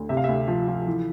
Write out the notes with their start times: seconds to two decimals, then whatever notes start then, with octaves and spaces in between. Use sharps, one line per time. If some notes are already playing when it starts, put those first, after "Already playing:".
Already playing: D2
0.09 C3 E5
0.17 F5
0.24 D2 E5
0.48 F3
0.68 F3
0.87 E3